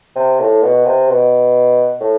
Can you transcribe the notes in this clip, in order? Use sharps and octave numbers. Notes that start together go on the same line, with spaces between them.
C3
A2
B2
C3
B2
A2